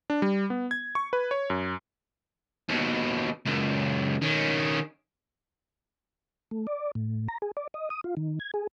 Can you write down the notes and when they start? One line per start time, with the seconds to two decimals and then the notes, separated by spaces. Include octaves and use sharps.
0.10 D4
0.22 G3
0.50 B3
0.71 G#6
0.95 C#6
1.13 B4
1.31 C#5
1.50 F#2
2.69 D#2 B2
3.46 C#2 F#2
4.22 D#3 C#4
6.51 A3
6.67 D5
6.95 A2
7.28 A#5
7.42 G#4
7.57 D5
7.74 D#5
7.90 D#6
8.04 F4
8.17 D#3
8.40 G#6
8.54 G#4